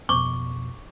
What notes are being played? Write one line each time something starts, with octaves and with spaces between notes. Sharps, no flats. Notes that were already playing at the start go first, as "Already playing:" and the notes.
F2 B2 C#6 D6